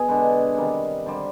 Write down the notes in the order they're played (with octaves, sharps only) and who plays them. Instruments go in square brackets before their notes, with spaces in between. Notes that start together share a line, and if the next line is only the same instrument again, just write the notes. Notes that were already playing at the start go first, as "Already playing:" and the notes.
Already playing: [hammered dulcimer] B2 G#4
D3 G#3 B4
C3 D#3 G3
D3 G3 C5